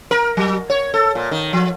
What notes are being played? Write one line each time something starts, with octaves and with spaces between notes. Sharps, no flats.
A#4
F#3
C#5
A4
A#2
D#3
F3